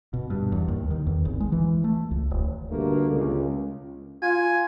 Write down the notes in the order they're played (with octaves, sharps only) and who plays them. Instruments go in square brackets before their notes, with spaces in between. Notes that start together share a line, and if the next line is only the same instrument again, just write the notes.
[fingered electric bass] B2
G2
E2
D#2
D#3
E2
G#1
G#3
E3
A3
C#2
D#1
[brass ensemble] G2 B2 D3 A3 A#3
C#2
[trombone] F4 [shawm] G#5